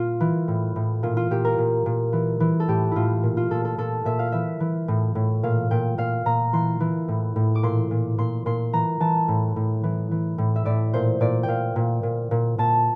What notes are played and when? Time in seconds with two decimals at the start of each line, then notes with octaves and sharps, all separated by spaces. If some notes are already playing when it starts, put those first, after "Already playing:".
Already playing: A#2 F4
0.20 E3
0.48 A2
0.76 A2
1.03 A#2 F4
1.17 F4
1.31 A#2 G4
1.45 A#4
1.58 A#2
1.86 A#2
2.13 E3
2.40 E3
2.60 A4
2.68 A2 G4
2.91 A2 E4 F4
3.23 A#2
3.37 F4
3.50 A#2 A4
3.65 A4
3.78 A#2 A4
4.05 A#2 E5
4.19 F5
4.32 E3 E5
4.60 E3
4.88 A2
5.15 A2
5.43 A#2 F5
5.71 A#2 G5
5.98 A#2 F5
6.26 A#2 A#5
6.53 E3 C6
6.80 E3
7.08 A2
7.36 A2
7.55 D6
7.63 A#2 C6
7.91 A#2
8.18 A#2 C6
8.46 A#2 C6
8.73 E3 A#5
9.00 E3 A5
9.28 A2
9.56 A2
9.83 E3
10.11 E3
10.38 A2
10.56 E5
10.65 A2 D5
10.93 A#2 C5
11.21 A#2 D5
11.43 G5
11.48 A#2 F5
11.76 A#2
12.03 A#2
12.31 A#2
12.58 A#2 A5